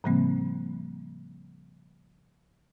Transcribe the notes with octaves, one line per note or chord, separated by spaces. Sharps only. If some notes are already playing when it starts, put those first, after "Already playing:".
A2 C#3 F3 G3 A#3 C4